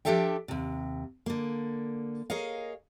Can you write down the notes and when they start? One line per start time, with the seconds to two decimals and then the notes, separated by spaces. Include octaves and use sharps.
0.05 F3 D4 G4 A4 E5 G5
0.48 D#2 C3
1.26 D3 A#3
2.30 G#4 A#4 C#5 D#5 F5